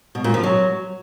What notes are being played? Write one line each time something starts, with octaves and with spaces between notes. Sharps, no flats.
B2
A#2
F3
F#3